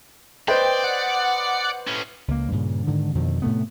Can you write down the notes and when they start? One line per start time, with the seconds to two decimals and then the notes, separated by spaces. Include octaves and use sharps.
0.48 B4 C5 D5 D#5 G5
0.84 F#5
1.87 A2 C#4
2.28 C#2 A#3
2.52 G2 A#2 C#3
2.87 G#2 D3 D#3
3.15 F2 B2 D3 D#3
3.42 A2 C3 A3 B3